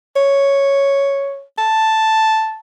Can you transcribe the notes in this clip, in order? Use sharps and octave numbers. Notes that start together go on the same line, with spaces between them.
C#5
A5